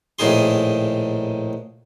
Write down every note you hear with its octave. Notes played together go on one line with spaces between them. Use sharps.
A#1 A2 D#3 D#4 G#4 C6